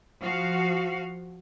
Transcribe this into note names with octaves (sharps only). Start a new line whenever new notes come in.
F3 F#4 F5